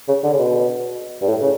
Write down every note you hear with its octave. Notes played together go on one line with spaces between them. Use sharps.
C#3
D3
C#3
B2
G2
A2
C#3